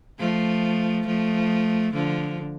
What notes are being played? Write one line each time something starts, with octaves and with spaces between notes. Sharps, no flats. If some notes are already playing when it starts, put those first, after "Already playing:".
F3 A3
F3 A3
D3 F3